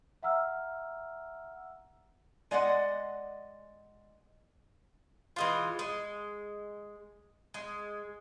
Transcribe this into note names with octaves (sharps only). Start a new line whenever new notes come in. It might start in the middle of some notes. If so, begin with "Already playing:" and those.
E5 F#5 A#5 E6 F6
G#3 D5 D#5 F#5
E3 G#3 F4
G#3
G#3